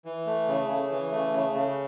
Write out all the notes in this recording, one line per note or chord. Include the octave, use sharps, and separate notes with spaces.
E3
A3
C#3
C#3
E3
A3
C#3
C#3